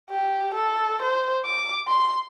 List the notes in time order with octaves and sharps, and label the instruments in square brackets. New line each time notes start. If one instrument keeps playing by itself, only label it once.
[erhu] G4
A4
C5
D6
C6